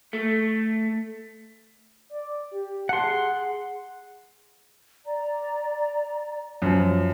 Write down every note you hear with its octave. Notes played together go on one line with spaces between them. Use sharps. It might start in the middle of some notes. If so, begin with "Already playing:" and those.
A3
D5
G4
F#5 A5 C6
G#4
D5 A#5
F#2 F3